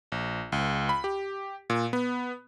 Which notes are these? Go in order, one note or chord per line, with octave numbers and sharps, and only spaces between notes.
A#1
C#2
B5
G4
A#2
B3